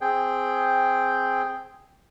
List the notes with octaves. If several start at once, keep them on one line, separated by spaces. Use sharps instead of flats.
C4 G#4 G5